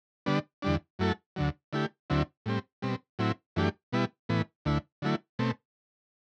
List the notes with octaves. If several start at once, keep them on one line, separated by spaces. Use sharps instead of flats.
D3 G3 B3 D4
E2 D3 G3 D4
F#2 F#3 A3 E4 A4
D2 D3 F#3
D3 A3 E4 G4
D2 D3 F#3 C4 E4
A2 G3 C4
B2 G3 C4
A2 F#3 C4 E4
F#2 E3 A3 D4 G4
B2 G3 B3 E4
A2 E3 B3
D2 D3 A3 E4
D3 F#3 A3 E4
B2 A3 C4